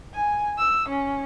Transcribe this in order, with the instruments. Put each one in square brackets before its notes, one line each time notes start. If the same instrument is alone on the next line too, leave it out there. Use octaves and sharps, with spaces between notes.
[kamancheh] G#5
E6
C#4